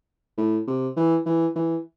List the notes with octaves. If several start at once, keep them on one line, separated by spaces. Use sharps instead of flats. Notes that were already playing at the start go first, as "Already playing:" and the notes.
A2
C3
E3
E3
E3